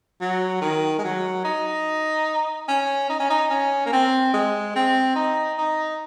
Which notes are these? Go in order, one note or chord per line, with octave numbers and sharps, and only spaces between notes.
F#3
D#3
G#3
F#3
D#4
C#4
D#4
C#4
D#4
C#4
A#3
C4
G#3
C4
D#4
D#4